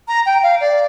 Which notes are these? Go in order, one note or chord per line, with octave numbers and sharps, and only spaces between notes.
A#5
G5
F5
D5